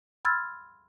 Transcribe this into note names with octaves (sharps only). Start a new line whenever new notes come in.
B5 C6 E6 F6 G#6 A6